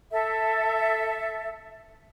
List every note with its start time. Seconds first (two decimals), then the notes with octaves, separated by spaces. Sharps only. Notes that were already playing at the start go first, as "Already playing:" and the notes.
0.11 A4 E5